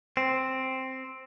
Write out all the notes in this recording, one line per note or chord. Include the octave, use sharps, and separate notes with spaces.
C4